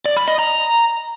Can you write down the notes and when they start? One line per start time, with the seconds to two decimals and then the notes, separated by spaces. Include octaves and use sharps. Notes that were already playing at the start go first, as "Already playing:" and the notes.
0.06 D5
0.17 B5
0.28 D#5
0.39 A#5